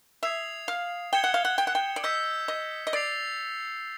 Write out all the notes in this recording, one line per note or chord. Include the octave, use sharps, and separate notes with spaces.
E5 D#6 G#6 C7 F7
F5
G5 G#6 C#7 E7 G7
F#5
F5
F#5
G5
F#5
G5
D5
D#5 E6 G6 B6
D#5
D#5
D5 A6 C7 F7